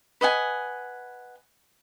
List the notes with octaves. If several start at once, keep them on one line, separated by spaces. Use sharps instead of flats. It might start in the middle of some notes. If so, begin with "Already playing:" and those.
B4 D#5 F#5 G#5